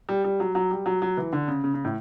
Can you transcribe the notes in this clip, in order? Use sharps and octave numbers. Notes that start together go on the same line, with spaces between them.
G3
G3
F#3
F#3
G3
F#3
F#3
E3
D3
C#3
C#3
C#3
A2